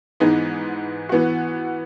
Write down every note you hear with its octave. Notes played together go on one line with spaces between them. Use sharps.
G#2 E3 G#3 B3 D#4
E3 B3 F#4